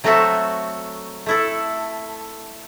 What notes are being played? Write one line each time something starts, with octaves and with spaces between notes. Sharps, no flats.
F#3 A3 C4 F#4 A4 E5
A3 E4 A4